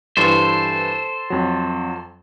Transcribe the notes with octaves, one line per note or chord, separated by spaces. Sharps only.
G2 E3 A4 C5
F2 F#3